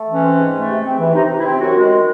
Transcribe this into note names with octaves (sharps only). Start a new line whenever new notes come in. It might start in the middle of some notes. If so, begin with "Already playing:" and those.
Already playing: A3
E3 C#4
C4
G#2
A3
C3
C4
E3
C3 D#4
C3
E4
C4
F#2 F#4
G#3
D#3